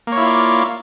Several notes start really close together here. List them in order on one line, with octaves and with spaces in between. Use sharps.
A#3 C#5 E4 F4 D5